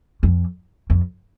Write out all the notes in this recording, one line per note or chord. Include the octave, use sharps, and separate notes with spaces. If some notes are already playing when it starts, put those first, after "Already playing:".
F2
F2